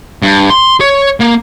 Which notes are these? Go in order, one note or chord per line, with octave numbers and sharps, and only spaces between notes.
G2
C6
C#5
A#3